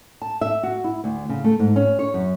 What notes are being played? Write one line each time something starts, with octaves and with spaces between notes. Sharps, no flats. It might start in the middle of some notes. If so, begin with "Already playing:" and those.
A5
E5
F#4
E4
D2
C#3
A3
G#2
C#4
C#5
F#2